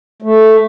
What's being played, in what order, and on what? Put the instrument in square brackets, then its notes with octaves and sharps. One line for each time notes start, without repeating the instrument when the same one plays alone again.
[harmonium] A3